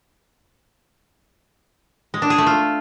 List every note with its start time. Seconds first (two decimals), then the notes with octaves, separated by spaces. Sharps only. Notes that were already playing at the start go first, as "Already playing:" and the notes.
2.14 G#3
2.22 D4
2.30 G#4
2.38 A3
2.46 F4